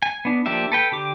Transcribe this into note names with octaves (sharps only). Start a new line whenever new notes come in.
G#5
B3 D4
F3 A#3 D4 G4 E5
A4 B4 G5
D3 G4 D6